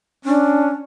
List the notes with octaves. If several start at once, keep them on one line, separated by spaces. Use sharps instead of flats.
C#4 D4